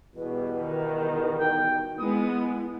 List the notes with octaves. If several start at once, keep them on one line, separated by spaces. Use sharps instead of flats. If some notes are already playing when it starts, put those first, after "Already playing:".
E2 B2 G3 B4
D#3
D#4 G5
G#3 B3 E4 D#6